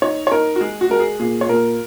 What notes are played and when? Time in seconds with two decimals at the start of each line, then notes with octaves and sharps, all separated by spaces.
0.02 D#4 C#5
0.27 C#5
0.32 D#4 A#4
0.56 F#4
0.61 G#3 G#4
0.81 F#4
0.90 G#3 A#4
0.99 G#4
1.20 A#2 G#4
1.41 C#5
1.49 A#2 A#4